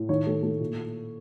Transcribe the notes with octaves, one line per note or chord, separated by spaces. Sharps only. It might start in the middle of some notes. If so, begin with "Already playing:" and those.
Already playing: A2
D#3 C#5
A3
A3
A#2